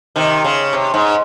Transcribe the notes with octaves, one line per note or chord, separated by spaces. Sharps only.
C3 D#3
C#3
C3
G#2